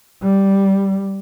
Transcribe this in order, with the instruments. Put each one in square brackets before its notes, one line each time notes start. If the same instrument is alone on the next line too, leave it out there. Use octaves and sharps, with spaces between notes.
[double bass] G3